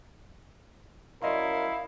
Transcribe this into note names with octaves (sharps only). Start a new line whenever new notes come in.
F#2 E4 A#4 D5 D#5 F5 C6